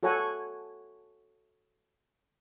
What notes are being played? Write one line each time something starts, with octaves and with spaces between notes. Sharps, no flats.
F#4 A4 C#5 F#5 G#5